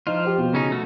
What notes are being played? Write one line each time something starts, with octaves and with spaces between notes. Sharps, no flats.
F3 D#4 F4
G4 C5
B2
C#3 C#4 D#4
A3 F#4